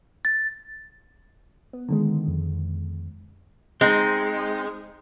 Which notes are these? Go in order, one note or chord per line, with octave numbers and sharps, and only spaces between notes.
A6
B3
D3 D#3 G#3
F2
G#3 C4 D#4